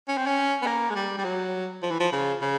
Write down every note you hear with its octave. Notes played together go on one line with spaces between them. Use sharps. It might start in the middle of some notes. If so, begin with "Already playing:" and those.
C#4
C4
C#4
B3
A#3
G#3
G3
G3
F#3
F3
E3
F3
C#3
C#3